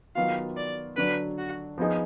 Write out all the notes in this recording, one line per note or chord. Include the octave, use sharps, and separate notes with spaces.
D#3 F#3 B3 F4 F5
D5
D3 F#3 D4 B4
F#4
F3 B3 D#4 G#4